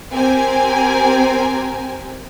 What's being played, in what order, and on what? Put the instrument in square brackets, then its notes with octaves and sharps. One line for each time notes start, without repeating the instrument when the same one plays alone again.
[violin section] C4 G4 A#4 G#5